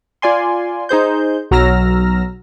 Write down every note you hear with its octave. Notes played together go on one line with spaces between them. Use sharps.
F4 D5 G#5 C6
D#4 G#4 C5 G6
B1 F#3 A#5 E6 F6 A#6